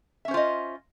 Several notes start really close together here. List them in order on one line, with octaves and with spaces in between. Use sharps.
E5 C#4 C5 F4 D#5